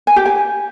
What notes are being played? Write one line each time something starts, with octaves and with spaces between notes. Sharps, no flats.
G#5
G4
G#5